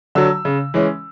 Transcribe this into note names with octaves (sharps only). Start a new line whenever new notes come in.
D3 F#3 E6
C#3
E3 G#3 C#4